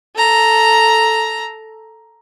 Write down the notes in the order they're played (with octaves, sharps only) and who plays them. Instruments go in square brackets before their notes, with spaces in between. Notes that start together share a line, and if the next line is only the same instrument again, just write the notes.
[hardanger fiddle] A4 A#5